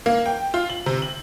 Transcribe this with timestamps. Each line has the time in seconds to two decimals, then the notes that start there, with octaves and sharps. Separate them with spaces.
0.06 A#3
0.26 G5
0.54 F4
0.69 F#7
0.86 C3
1.02 F#7